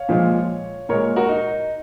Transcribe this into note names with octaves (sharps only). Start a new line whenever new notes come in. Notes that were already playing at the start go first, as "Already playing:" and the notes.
Already playing: C#5 F5
A#2 F3 G#3
A#2 G#3 A#4 C#5
F#4 A#4
D#4